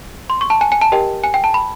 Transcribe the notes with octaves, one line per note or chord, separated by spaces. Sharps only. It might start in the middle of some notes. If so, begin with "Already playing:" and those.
C6
C#6
A5
G#5
G#5
A5
G4 A#4 D#5 G5
G#5
G5
A5
B5